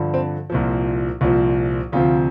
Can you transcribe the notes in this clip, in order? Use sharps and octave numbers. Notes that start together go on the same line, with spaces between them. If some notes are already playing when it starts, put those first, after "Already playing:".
Already playing: G2 D3 F3
C4
C2 A#2 F3
C2 A#2 F3
D2 C3 F3 F4